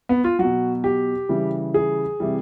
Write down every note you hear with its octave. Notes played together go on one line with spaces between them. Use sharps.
B3
F4
B2 F#3 F#4
G4
C#3 E3 G3
G#4
C3 E3 G3